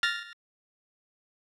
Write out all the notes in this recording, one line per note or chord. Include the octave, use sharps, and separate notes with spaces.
F6 A6 A#6